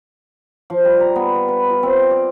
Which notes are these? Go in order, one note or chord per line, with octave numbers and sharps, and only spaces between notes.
F3
G3
A#5
B3
F5
B4
F4
C4
D#5
D5